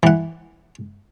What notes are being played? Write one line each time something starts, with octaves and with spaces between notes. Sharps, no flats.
E3 F#5